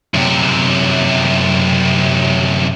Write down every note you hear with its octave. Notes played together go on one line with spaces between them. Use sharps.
F#2 C3